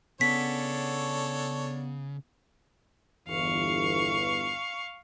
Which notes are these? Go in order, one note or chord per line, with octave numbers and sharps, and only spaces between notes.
C#3 B3 D4 A4 C#5 B6
G1 E2 E3 F5 C#6